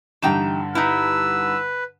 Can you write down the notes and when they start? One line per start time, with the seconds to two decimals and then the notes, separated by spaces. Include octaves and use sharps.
0.22 G2 D3 E3 D#4 G5 E7
0.75 D#4 E4 B4 E6